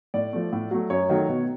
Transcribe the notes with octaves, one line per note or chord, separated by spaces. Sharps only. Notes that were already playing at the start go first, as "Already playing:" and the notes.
A2 D5
F3 A3
A2
F#3 A3
F#2 C#5
D#3 F#3 A3
B2